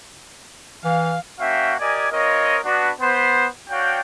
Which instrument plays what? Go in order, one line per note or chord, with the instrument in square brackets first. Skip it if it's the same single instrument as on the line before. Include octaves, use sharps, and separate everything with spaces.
[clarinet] E3 [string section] F5
[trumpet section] A#3 C#4 F#4 E5 F5 G5
G4 A#4 D5 D#5 G#5
C4 F4 A#4 C#5 D#5
B3 D4 F#4
B3 C5
D4 F#4 C#5 F5 G5